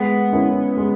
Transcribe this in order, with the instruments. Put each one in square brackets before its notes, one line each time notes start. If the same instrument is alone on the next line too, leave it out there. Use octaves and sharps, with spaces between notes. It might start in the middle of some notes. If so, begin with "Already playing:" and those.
Already playing: [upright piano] G#3 [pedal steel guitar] B3
[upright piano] C#4 E4 A#4
G#3